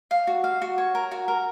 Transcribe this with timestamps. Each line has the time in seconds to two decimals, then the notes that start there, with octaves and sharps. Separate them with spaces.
0.11 F5
0.27 F#4
0.44 F5
0.62 F#4
0.78 C#5
0.95 A#4
1.11 F#4
1.28 A#4